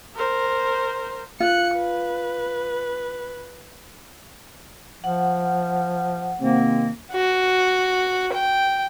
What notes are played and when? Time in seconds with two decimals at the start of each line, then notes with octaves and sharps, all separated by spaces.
0.15 A#4 C5
1.40 F4 F#6 C#7
1.77 B4
5.04 F3 F#5
6.40 C3 D#3 A#3 C4
7.12 F#4
8.33 G5